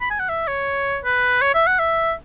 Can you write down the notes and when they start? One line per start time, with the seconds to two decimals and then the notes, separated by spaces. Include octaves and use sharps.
0.01 B5
0.11 G#5
0.20 F#5
0.29 E5
0.48 C#5
1.05 B4
1.42 C#5
1.55 E5
1.67 F#5
1.79 E5